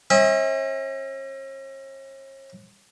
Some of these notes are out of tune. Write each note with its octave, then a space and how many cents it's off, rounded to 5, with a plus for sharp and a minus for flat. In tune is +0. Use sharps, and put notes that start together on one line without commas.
C#4 -45 E5 -40